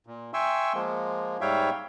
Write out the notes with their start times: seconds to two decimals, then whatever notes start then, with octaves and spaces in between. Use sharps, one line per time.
0.07 A#2
0.34 E5 G5 G#5 C6 C#6 E6
0.74 F3 G#3 A#3
1.41 G#2 G3 C#5 E5 F5 G5